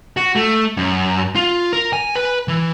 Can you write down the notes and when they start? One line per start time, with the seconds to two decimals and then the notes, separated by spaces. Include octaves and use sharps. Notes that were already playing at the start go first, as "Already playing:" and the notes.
0.17 F#4
0.36 A3
0.77 F#2
1.35 F4
1.73 A#4
1.93 G#5
2.16 B4
2.48 E3